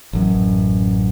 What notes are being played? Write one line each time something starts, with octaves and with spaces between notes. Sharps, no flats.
A1 F#2